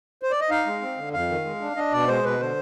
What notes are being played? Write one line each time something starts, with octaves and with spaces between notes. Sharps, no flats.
C5
D5
D#5
D#4 F5
G#3
C4
D3
F2 F5
D#3
G#3
D4
D4 D#5
B2 D5
G#3 C5
B2 B4
D3 C5